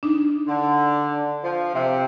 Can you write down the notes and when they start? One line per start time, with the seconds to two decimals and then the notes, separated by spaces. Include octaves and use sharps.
0.03 D4 D#4
0.48 D3
1.44 F3
1.74 C3